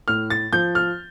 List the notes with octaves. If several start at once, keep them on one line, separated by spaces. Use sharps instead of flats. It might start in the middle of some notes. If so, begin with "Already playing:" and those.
A2 F6
A6
F3 G6
F6